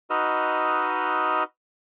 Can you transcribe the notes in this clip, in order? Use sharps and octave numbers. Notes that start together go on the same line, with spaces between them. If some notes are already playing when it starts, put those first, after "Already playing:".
D#4 F#4 B4 D#5 E6 F6